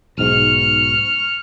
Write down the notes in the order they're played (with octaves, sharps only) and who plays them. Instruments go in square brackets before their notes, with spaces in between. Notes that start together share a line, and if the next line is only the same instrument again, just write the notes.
[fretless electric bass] B1 G#2 [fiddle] C#6 F6